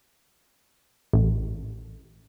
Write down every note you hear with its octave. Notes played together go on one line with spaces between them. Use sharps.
A1